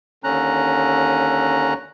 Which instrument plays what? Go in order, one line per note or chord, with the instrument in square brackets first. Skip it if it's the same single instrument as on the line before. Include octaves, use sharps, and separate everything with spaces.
[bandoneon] D#2 D3 C#4 A#5 F#6